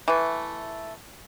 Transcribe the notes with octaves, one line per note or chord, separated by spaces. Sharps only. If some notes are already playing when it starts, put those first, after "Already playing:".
E3 A3